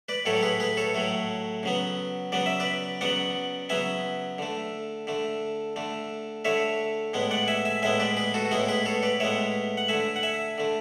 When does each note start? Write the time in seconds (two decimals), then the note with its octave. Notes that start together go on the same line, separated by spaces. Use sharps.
0.09 B4 D5
0.25 A2 F#3 A3 A4 C#5
0.37 C#5
0.43 G#4 B4
0.60 G#4 B4
0.77 A4 C#5
0.95 A2 F#3 A3
1.63 C#3 F#3 B3
2.32 C#3 F#3 B3 D5
2.46 E5
2.60 B4 D5
3.01 C#3 F#3 B3 D5 F#5
3.69 C#3 F#3 B3 E5 G#5
4.38 D3 A3
5.07 D3 A3
5.76 D3 A3
6.45 D3 A3 C#5 E5
7.14 A2 G#3 B3
7.31 D5 F#5
7.48 E5 G#5
7.65 E5 G#5
7.82 A2 G#3 B3 E5 G#5
8.00 B4 D5
8.17 G#4 B4
8.34 F#4 A4
8.45 F#4
8.51 A2 G#3 B3 E4 G#4
8.68 G#4 B4
8.86 A4 C#5
9.03 B4 D5
9.20 A2 G#3 B3 C#5 E5
9.77 F#5
9.88 D3 A3 E5 G#5
10.16 F#5
10.23 E5 G#5
10.58 D3 A3